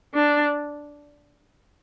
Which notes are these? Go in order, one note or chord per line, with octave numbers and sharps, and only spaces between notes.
D4